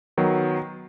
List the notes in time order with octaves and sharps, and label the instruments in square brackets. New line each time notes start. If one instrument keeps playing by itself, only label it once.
[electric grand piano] D#3 F#3 B3